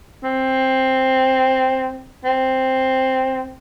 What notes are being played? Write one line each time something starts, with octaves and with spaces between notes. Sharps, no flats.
C4
C4